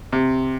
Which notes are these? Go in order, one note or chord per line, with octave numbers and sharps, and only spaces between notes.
C3